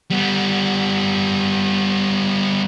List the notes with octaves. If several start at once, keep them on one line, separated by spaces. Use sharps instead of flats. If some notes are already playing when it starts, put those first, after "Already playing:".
G3 B3